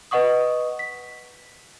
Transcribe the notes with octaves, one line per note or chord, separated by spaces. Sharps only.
B4 D#5 F#5 C#6 D#6
B6